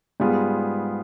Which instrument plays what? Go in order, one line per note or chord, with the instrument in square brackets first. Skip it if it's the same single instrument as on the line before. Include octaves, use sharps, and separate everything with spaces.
[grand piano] G#2 G3 B3 F4 G#4